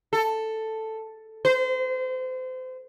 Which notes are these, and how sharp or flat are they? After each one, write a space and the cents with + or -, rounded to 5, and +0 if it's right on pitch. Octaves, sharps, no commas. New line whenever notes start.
A4 +5
C5 -30